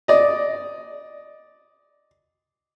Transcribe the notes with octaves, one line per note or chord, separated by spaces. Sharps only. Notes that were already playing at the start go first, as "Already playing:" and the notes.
D5 D#5